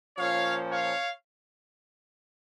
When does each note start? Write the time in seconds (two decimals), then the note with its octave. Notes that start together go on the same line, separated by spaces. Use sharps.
0.16 A#2 F3 C#4 C#5 F5
0.70 C#5 F5